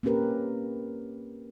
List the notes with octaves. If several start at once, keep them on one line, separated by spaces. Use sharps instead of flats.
A#3 C4 C#4 G4 A#4 B4